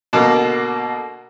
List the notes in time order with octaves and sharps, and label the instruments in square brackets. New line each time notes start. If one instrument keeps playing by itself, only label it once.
[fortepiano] B2 D3 A#3